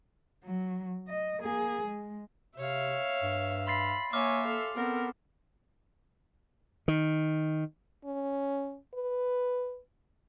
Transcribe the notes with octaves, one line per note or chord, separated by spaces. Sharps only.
F#3
D#5
A#3 G#4
G#3
C3 C#5 E5 F5
G2
B5 C6 A6 C7
A#3 C#5 E5 G#5 D6 F6
A4 F5
B3 C4 A4 A#4
D#3
C#4
B4